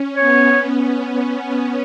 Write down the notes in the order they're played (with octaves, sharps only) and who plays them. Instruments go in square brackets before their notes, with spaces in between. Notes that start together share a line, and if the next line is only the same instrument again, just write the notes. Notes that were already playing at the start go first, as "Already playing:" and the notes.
Already playing: [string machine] C#4
[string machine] B3 [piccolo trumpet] C#5